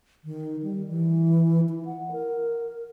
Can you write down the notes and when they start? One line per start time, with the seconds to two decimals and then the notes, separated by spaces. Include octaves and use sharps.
0.24 D#3
0.63 G3
0.88 E3
1.69 E4
1.85 F#5
2.12 A#4